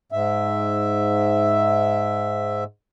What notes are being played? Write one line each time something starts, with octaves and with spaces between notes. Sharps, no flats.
G#2 E5